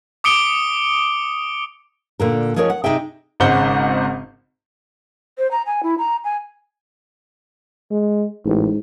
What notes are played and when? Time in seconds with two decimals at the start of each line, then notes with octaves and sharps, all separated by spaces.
0.24 D6 D#6 C#7 D7 G7
2.20 A#2 D3 A#4
2.56 F3 G#3 C#4 A#4 C5 C#5
2.70 F#5
2.84 C3 D#4 G#4 E5 G5
3.40 G#1 G#2 C#3 C5 F#5 G7
5.38 C5
5.51 A#5
5.66 G#5
5.83 E4
5.98 A#5
6.24 G#5
7.91 G#3
8.45 A1 G#2